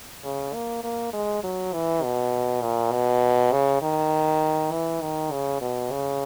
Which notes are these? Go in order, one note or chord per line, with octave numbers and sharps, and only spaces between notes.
C#3
A#3
A#3
G#3
F#3
E3
B2
A#2
B2
C#3
D#3
E3
D#3
C#3
B2
C#3